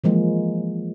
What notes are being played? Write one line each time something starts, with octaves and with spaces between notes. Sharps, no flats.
E3 F3 G#3 A#3